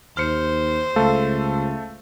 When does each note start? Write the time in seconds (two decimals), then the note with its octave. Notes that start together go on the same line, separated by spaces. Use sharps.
0.17 D#2 C5 F6 C#7
0.96 C#2 A3 A4 F5